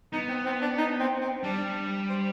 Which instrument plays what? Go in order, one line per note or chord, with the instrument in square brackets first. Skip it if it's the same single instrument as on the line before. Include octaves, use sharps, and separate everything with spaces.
[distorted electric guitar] B3 [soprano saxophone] D#4
[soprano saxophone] C4
C4
D4
D#4
C4
C4
[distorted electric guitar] G3 [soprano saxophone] D4
[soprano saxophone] C5